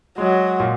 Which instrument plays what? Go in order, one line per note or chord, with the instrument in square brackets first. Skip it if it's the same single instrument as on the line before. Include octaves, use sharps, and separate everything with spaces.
[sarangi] F#3 [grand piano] G#3
[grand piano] A#2